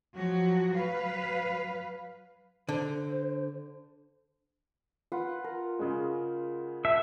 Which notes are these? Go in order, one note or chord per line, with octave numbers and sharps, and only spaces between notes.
F3 F#3 F#4
F#3 B4 F5
D3 C5
F4 B4 F#5
A#4
C#3 G#3
E5 A5